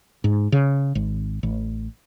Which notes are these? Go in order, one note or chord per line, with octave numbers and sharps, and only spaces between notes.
G#2
C#3
G#1
A1